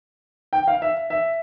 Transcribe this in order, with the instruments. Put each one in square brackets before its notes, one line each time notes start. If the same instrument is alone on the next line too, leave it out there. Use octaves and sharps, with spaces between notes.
[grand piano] G5
F5
E5
E5